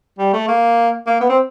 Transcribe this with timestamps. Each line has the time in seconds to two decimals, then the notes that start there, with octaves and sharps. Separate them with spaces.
0.19 G3
0.33 A3
0.48 A#3
1.07 A#3
1.21 B3
1.30 C4